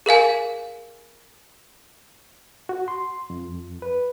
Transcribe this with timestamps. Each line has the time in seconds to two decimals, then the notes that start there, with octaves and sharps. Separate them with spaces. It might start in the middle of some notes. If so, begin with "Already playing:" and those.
0.06 G#4 A#4 F5 G#5
2.69 F#4
2.88 C6
3.30 F2
3.82 B4